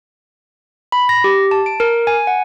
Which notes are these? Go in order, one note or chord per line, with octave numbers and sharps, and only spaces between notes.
B5
A#6
G4
A5
D7
A#4
G#5
F#5